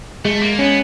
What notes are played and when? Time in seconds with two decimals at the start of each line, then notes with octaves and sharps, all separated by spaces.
0.25 G#3 A3
0.43 A#3
0.59 B3 C#4